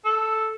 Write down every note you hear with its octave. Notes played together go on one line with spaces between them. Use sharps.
A4